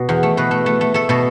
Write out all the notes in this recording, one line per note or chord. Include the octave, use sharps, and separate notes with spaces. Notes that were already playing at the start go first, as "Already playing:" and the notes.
Already playing: B2
E2
A3
B2 B4
A3
A3
A3
A3 A4
B2 A4